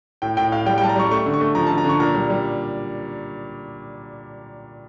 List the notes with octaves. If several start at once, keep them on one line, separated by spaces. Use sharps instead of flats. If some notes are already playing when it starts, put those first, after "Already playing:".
A2 G5
A2 G5
A2 F5
G3 G5
G5
G3 A5
A#5
G3 C#6
A3 C#6
D3
C#6
A3
F3 A#5
A5
D3
A#5
D3 C#6
A#2 A#5
G3
G3